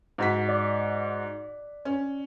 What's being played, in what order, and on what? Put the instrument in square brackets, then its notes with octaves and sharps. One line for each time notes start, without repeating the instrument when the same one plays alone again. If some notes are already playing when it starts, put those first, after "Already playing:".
[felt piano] G#2 F#4 B6
[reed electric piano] D5
[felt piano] C#4